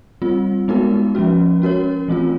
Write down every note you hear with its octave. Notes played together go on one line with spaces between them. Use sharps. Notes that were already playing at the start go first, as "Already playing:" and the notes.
G3 C4 F4
G#3 B3 D#4 F#4 A#4
F3 G#3 C#4 F#4
C#4 F#4 A#4 C#5
E3 A3 C4 F4